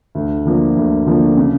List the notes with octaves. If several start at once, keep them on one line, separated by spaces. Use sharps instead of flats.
D2
D3 F3 A#3
D2
D3 F3 A#3
C#3